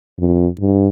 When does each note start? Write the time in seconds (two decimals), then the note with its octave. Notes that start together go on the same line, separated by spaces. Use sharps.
0.19 F2
0.60 G2